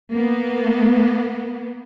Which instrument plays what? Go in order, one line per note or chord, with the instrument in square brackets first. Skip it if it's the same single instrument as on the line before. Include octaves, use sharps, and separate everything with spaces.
[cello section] A#3 B3